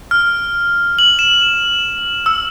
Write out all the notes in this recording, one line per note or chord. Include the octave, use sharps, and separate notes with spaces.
F6
F#7
E7
E6